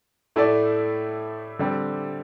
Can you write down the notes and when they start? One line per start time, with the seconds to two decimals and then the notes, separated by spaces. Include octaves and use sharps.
0.36 A2 A3 E4 A4 D5
1.59 D3 G3 C4 G4